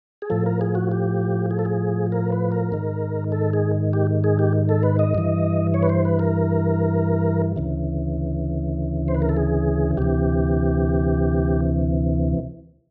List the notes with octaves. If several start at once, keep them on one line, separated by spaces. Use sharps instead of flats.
G#4
A2 F3 A4
A#4
G#4
F#4
G4
G#4
A4
G#4
A#4
B4
A#4
G#2 D#3
A4
G#4
G4
G#4
G4
A4
B4
D#5
G2 E3
C#5
B4
C5
B4
A#4
D2 C#3 E3
C5
B4
A#4
A4
G#4
D2 C3 E3 G4